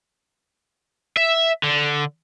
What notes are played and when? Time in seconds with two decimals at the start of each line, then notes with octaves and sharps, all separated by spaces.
1.17 E5
1.63 D3